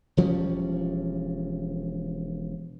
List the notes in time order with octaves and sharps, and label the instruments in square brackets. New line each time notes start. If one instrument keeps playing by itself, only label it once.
[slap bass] E1 F3 G3 C#4